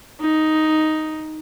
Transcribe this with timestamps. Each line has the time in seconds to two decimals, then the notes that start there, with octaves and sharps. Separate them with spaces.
0.21 D#4